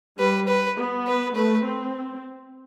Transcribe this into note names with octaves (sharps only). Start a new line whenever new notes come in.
G3 B4
B4
B3
B4
A3 B4
C4